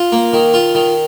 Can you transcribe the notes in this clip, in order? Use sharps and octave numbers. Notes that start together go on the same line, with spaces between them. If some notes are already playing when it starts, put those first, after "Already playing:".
Already playing: F4
A#3
D#3
F4
D#3